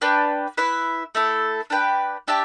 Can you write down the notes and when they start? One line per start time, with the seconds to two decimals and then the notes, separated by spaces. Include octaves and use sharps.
0.01 D4 B4 D5 G5
0.57 E4 B4 E5
1.15 A3 E4 A4
1.70 D4 G4 B4 G5
2.28 D4 G4 E5 A5